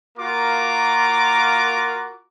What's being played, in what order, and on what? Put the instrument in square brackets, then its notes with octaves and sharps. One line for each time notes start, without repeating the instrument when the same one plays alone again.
[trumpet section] A#3 F4 F#4 A#4 D6